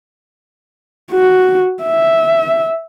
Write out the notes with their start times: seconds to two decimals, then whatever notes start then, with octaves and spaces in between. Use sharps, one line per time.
1.12 F#4
1.84 E5